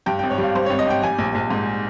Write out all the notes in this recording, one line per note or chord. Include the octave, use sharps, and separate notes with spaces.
G2 G5
G5
G#1
C#5
G3 F5
G2 C5
C#5
G#1
D#5
G#1 G5
G3 G#5
A#1
A#1
G#2